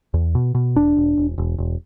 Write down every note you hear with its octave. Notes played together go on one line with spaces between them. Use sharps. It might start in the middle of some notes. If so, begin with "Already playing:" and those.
E2
B2
B2
E1 D4
E1
E1
E1
E1